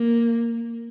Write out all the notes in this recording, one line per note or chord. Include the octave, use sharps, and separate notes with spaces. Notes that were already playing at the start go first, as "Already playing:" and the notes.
Already playing: A#3